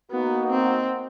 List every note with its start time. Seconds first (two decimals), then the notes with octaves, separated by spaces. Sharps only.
0.11 A#3 B3 D#4 F#4
0.51 C4